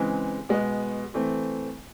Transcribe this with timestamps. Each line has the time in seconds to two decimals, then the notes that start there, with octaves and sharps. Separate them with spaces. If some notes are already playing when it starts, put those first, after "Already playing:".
Already playing: C#3 E3 G#3 C4
0.49 B2 G#3 B3
1.14 E3 A3 C4